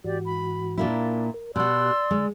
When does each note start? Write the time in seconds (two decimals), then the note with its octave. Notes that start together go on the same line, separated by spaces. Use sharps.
0.04 G#2 E3 F#4 G4 D5
0.25 B5
0.78 A#2 A#3 D4 E4
1.34 A#4
1.56 B2 F#4 G4 D5 C6 E6 F#6
2.11 D3 G#3